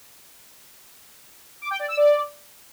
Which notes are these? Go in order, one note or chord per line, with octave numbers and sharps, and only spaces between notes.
D6
G5
D5
E6
D5